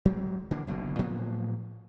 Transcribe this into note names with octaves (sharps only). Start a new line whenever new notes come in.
F#3 G#3 C4
D3 E3 A#3 D4
F#1 B1 B2 D3
A2 F3 F#3 B3